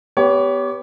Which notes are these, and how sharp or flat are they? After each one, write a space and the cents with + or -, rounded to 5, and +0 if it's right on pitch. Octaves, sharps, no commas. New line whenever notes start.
B3 +10 G4 +0 C#5 +30